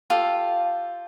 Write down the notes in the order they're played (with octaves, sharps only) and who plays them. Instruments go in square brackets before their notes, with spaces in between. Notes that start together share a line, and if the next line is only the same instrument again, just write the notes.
[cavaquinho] F4 G4 A4